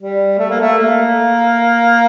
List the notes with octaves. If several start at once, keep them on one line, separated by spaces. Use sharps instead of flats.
G3
A3
A#3
A3
A#3